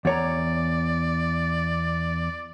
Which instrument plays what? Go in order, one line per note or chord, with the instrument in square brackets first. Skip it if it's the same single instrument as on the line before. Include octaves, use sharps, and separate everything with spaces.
[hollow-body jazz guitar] E2 C#5 A#5 [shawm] D5